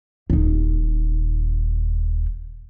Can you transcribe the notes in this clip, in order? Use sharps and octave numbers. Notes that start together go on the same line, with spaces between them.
D#1 D#4